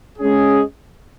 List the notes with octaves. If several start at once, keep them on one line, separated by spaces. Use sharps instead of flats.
G#3 C#4 G#4